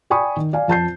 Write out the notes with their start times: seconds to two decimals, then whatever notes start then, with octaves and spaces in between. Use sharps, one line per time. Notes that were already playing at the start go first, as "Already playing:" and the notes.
0.10 D5 G5 G#5 B5 C#6 D#6
0.37 D#3
0.53 D5 F5 G#5
0.68 F2 A5 G6 C7